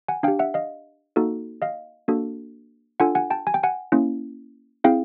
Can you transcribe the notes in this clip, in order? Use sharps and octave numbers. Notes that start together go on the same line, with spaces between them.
F#5 G#5
D4 G4 F5 G5
E5 F#5
D#5 F5
A#3 D#4 F#4 A4
D#5 F5
A#3 D4 F#4 A4
D4 F4 A4 F#5 G#5
F#5 G#5
G5 A5
G#5
G5
F#5 G#5
A#3 C#4 E4
C4 E4 G#4 F5 G5